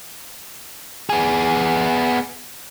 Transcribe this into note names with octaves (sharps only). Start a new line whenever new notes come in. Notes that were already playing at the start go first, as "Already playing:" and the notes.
B3 G#4